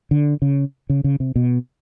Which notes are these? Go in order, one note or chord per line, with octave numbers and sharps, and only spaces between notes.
D3
C#3
C#3
C#3
C3
B2